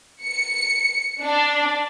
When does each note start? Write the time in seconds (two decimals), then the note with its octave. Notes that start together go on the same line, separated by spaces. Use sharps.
0.22 C#7
1.22 D4